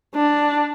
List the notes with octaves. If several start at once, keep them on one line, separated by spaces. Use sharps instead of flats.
D4